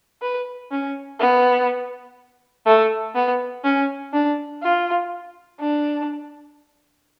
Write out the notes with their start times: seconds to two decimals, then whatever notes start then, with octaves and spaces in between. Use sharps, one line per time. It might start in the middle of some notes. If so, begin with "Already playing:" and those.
0.22 B4
0.71 C#4
1.20 B3
2.66 A3
3.15 B3
3.64 C#4
4.13 D4
4.62 F4
5.60 D4